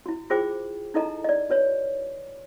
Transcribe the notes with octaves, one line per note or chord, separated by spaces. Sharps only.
E4 F#4
F4 F#4 G#4 C5 G5 D6
D#4 E4 A4 D#5 A#5
D5 D#5
F#4 B4 C#5